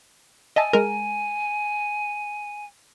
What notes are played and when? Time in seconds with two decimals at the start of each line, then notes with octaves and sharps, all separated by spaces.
0.56 D#5 E5 G#5 A5
0.73 G#3 A#4